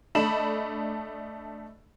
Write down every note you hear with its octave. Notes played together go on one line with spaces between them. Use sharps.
A3 D4 D#5 B5 E7 F#7